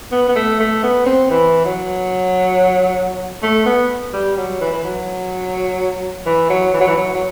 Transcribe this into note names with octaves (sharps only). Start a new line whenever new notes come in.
B3
B3
A3
A3
B3
C4
E3
F#3
A3
B3
G3
F#3
E3
E3
F#3
E3
F#3
E3
F#3
E3
F#3
F#3